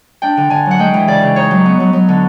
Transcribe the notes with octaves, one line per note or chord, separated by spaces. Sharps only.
D4 G5
D3
D3 G#5
F#3
F#5
G#3 G5
E3
C#3 D5
C#3
D#4 C#5
F#3
B3
F#3
F#3
D3